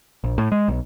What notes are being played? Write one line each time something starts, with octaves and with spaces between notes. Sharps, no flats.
A#1
A2
G#3
B1